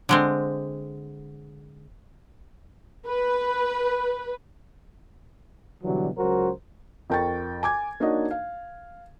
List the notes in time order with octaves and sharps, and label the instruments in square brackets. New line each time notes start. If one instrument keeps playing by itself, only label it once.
[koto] D3 G#3 C4
[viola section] B4
[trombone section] B2 D3 E3 F#3 G3
C#2 F#3 F#4 A#4 C5
[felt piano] F2 A#4 G5 C#6 A6
G#5 D6 G#6
A#3 D4 D#4 F#4 C#5 D#5
F5